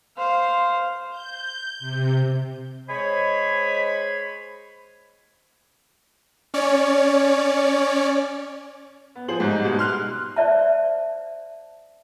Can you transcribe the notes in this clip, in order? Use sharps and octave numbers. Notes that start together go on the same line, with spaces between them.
C5 F5
G6
C3
G#3 C5 C#5 D#5 G#5 B5
C#4 C#5 D5
B3
F3 G#4 C5 F#7
G#2 G3 D#4
B2 G3 G#3
C6 F6 F#6
C5 D5 E5 A5